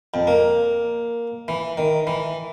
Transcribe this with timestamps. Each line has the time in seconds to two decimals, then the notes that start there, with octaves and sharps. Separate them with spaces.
0.14 F2
0.27 A#3
1.48 E3
1.77 D#3
2.07 E3